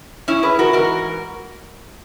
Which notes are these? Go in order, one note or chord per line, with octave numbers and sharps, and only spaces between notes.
C#4 E4
G#4 B4
F#4 A#4
G#2 E3 F#4 A#4